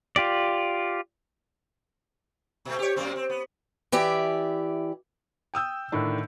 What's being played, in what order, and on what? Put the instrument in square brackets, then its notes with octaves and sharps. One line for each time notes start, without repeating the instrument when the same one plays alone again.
[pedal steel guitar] F4 G4 D5
[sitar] B2 A3
G4 C#5
F#2 A#3 C4
C4
B3
[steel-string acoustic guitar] E3 G4 D5 E5
[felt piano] G5 D#6 E6 G6
A2 D3 D#3 D4